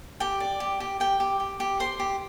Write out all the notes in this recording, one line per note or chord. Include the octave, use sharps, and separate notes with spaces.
G4 G5
D5
G4
G4
G4 G5
G4
G4
G4
C5 C6
G4